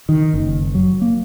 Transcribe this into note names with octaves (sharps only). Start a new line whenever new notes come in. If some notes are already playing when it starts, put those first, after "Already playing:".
D#3
F#1
F#3
A#3